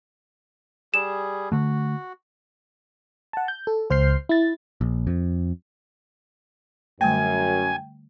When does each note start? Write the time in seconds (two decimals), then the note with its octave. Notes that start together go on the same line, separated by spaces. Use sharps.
0.94 G3 G#4 E7
1.52 D3 A3 F#4
3.33 F#5 A5
3.48 G6
3.67 A4
3.90 C#2 C5 F6 G6 C7
4.29 E4 A6
4.81 A#1
5.07 F2
7.01 F#2 D3 G3 A3 G5 G#5